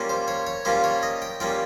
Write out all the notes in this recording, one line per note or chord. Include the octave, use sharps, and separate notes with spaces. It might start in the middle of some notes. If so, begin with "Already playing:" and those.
Already playing: G3 A#3 C#4 F4
C5
C#5
C#5
G3 A#3 C#4 F4 C5
C#5
D#5
G5
G3 A#3 C#4 F4 G5